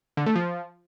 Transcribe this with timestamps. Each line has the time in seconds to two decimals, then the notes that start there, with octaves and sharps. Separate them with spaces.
0.17 D3
0.26 A3
0.35 F3